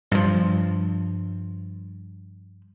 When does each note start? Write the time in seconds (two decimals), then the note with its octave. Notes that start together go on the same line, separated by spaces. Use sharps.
0.11 G2 F3